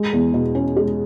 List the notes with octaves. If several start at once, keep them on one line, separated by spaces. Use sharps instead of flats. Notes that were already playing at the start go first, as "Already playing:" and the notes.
Already playing: G#3
E2
B2
C#4
G#3